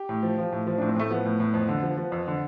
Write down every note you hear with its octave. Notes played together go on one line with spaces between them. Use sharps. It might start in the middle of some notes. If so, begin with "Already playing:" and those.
Already playing: G4
A2
F3
F3
A2
F3
A2 D4
C4
A2 A3
F3 B3
A2
A2
F2
D3
F3
F3
F2
D3